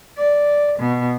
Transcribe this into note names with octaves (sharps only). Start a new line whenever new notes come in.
D5
B2